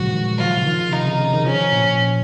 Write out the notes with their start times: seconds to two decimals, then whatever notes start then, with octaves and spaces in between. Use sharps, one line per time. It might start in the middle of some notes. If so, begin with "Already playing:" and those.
Already playing: A#2 C#3 F3 F#3 G#3 F#4
0.12 D#3
0.38 F3 F4
0.58 C#3
0.66 D#3
0.92 C3 D#4
1.06 C#3
1.20 C#3
1.33 D#3
1.46 F3 C#4
1.72 A#2